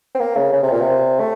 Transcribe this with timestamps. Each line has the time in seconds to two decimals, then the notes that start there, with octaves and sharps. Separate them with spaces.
0.15 C4
0.19 A#3
0.36 C#3
0.52 C#3
0.63 C3
0.72 A#2
0.81 C3
1.20 A3